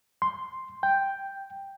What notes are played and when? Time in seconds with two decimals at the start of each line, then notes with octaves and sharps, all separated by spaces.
0.22 C6
0.83 G5